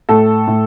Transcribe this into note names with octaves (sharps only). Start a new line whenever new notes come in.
A2 A4
A2